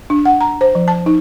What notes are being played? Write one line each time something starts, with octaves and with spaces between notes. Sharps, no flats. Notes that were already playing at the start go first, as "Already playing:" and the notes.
D4
F#5
A#5
C5
F3
A5
D#4